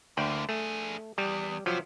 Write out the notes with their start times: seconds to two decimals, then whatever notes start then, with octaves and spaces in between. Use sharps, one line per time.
0.17 D2 D3 A#3 G5
0.49 A3 D4 G#4
1.18 E2 G3
1.66 C3 F3 F#3